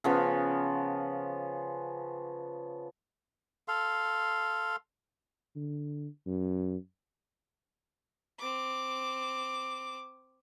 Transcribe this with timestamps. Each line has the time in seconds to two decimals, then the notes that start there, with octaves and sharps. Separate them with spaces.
0.04 C#3 F3 B3
3.68 A4 F5 C6
5.56 D3
6.26 F#2
8.39 C4 D6